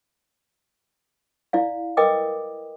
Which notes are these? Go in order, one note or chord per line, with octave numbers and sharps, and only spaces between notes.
E4 D5 F5
A#4 B4 D#5 G5 D6 D#6